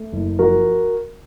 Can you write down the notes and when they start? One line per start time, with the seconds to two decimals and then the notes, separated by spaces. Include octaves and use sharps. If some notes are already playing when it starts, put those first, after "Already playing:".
Already playing: A3
0.13 F#1
0.39 F3 F#4 A#4